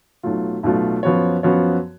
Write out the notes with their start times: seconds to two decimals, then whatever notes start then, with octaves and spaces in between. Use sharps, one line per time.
0.23 B1 B2 F#3 A3 F4
0.63 B1 B2 F#3 A3 F4
1.03 F#2 F3 B3 F#4 C#5
1.43 F#2 F3 B3 F#4 C#5